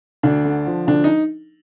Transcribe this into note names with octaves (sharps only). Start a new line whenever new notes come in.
D2 D4
D3
F3
D2 D4
D#4